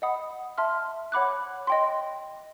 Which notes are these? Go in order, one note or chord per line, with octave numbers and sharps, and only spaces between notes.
D#5 F#5 B5 D#6
E5 A5 C6 F6
C#5 F#5 B5 D6 F#6
D#5 G5 C6